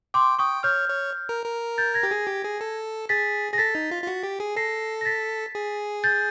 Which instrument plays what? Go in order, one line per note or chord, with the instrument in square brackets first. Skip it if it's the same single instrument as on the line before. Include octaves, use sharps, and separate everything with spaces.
[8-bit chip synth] G5 [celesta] C6 D6
[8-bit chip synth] G5 [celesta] C#6 D#6
[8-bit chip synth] C#5 [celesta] F6 G6
[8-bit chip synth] C#5
A#4
A#4
[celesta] G6 A6
G#6 A#6
[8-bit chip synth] G4
G#4
G4
G#4
A4
[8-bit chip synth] G#4 [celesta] A6 B6
[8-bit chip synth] G#4 [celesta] A#6
[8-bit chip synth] A4 [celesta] A6 B6
[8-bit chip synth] D#4
F4
F4
F#4
G4
G#4
[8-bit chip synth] A4 [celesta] A#6 C7
[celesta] A#6
A6 B6
[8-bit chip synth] G#4
[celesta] G6 A6